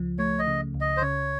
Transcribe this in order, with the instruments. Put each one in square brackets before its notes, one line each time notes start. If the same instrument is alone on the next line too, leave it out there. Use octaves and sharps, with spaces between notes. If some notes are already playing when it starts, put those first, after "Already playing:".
Already playing: [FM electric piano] C#2 C#3 F3
[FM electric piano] A3 [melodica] C#5
[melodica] D#5
[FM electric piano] C#3
C#2
[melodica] D#5
C5
[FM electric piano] C#3 [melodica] C#5